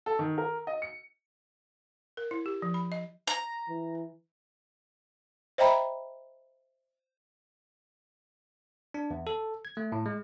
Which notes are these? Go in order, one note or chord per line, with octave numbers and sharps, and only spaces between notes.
A4
D#3
A#4
D#5
C#7
A#4
E4
G4
F3
B5
D#5
A#5
E3
C5 D#5 E5 G5 A#5 B5
D4
E2
A4
G#6
A3
A2
G#3